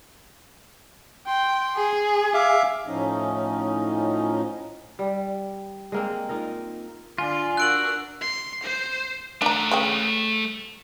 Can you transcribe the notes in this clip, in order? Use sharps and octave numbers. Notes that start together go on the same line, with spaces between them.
G5 C6
G#4
E5 F5 D6
A2 F3 C#4 D#4 D#5
G3
G#3 A#3 C4
D#4 F4 A#4
D3 F4 D5 G#5
D4 F#4 A#4 E6 F#6 D7 F#7
C6
C5
A3 D4 F#5 A#5
G#3 C#4 G5